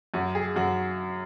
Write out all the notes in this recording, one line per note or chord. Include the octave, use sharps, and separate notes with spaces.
F#2 F#4
G#4
F#2 F#4